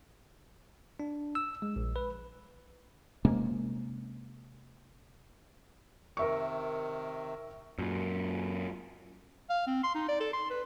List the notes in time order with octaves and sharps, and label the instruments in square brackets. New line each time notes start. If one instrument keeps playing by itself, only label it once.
[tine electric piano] D4
E6
G#3
A#1
B4
[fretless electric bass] C3 G#3 A#3 C#4
[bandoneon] C3 D#3 [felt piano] A#4 E5 C#6
[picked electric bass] F#2 A#2
[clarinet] F5
C4
C6
D#4
D5
A4
C6
B4